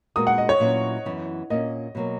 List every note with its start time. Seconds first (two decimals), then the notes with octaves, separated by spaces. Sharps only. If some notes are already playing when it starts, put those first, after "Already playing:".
0.16 A#2 G#3 B3 F#4 A#4 D#6
0.27 F#5
0.38 D#5
0.49 C#5
0.60 A#2 F#3 C#4 E4 B4
1.05 F#2 E3 B3
1.50 A#2 A#3 C#4 D#5
1.95 B2 F#3 A#3